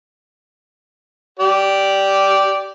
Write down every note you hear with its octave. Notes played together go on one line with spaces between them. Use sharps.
G4 D5